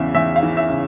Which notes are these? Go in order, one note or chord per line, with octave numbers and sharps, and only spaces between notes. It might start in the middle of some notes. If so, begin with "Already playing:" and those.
Already playing: E2 C#3 E3 E5
E2 E5
F5
E3
E5
C#3